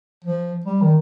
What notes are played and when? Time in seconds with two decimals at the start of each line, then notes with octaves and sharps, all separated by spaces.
0.24 F3
0.66 G3
0.82 D#3